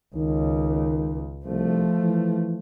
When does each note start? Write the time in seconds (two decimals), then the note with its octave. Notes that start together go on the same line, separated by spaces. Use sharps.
0.16 C#2 D#3
1.45 C2 F3 A3
2.00 E3